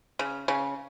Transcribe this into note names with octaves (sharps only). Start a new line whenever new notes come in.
C#3
C#3